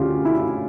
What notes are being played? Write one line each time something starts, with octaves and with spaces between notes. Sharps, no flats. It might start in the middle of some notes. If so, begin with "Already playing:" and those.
Already playing: D2 C#3 F4 G4
E4